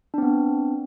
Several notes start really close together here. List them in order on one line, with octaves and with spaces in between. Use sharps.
D4 C4 B3